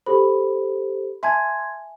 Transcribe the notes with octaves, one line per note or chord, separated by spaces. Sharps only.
G4 A4 C5 B5
E5 G#5 A5 C6 G#6